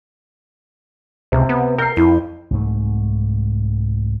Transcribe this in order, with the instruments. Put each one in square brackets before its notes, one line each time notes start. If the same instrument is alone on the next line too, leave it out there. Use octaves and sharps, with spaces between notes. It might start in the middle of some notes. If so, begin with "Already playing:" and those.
[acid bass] C#2 [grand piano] C3
[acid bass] B3
[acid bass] A#4 [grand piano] G6 C7
[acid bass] F2 [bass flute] E4
[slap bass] C2 G#2 A3